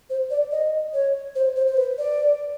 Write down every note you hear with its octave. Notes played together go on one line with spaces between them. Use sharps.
C5
D5
D#5
C#5
C5
C5
C5
B4
D5